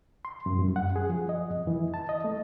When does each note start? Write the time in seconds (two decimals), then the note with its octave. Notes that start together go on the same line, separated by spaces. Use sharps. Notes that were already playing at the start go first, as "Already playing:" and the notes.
0.25 C6
0.46 F#2
0.59 F#2
0.76 F#5
0.96 G#4
1.09 F3
1.29 D#5
1.51 F2
1.67 E3
1.94 A5
2.09 D#5
2.24 A3